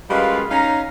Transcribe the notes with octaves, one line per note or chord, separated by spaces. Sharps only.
F#2 G3 G#3 F4 B4 F5
C#4 D#4 F5 A#5